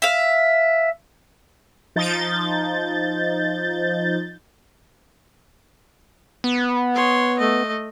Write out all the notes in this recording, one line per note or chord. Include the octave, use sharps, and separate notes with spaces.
E5 F5
F3 D#4 G6 A6
B3
C#5 C6
A3 D#5